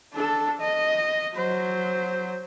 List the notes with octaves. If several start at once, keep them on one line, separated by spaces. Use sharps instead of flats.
D4 A4
D#5
F#3 C5